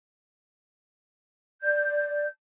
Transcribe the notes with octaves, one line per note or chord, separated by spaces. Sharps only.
D5 G6